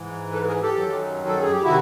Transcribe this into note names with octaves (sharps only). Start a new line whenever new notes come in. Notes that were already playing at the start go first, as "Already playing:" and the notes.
Already playing: G#2 E3
A4 B4
G#4 A#4
G4 A4
F#2 D#3 F#3
A4
G#4
G4
C3 D#3 E4 F#4